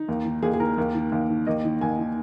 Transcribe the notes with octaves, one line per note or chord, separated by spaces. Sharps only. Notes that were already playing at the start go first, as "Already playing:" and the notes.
Already playing: D#4
D#2
D#3
D#2 G#4
G#4
D#3 A#4
D#2
D#3
D#2
D#3
D#2 D#5
D#3
D#2 G#5
D#3